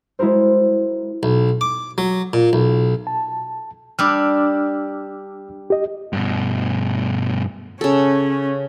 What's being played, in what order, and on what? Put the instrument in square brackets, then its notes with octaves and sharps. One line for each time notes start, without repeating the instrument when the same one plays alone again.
[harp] G#3 E4 F#4 A#4 C5
[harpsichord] B1
D6
F#3
A#2
B1
[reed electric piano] A5
[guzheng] G3 D4 [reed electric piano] D6 E6 F6
[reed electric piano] G4 D#5
[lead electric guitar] G2 B2
[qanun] C#3 A4 [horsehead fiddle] C#4